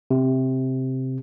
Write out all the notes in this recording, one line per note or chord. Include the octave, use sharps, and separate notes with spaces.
C3